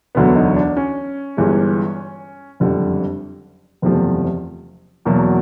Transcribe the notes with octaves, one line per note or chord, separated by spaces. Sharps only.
E1 D2 D3 F#3 B3
D#4
D4
C#4
G1 G2 E3 G#3
F#1 F2 D3 G3
F#1 E2 C3 F3 A3
E2 B2 F#3 A#3